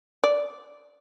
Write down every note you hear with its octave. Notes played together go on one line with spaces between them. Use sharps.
D5